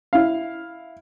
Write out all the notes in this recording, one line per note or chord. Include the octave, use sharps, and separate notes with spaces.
E4 F5